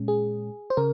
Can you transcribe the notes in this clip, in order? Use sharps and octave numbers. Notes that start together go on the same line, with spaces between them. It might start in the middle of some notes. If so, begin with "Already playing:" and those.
Already playing: A#2 G#3 C#4
G#4
C5
C#3 A#4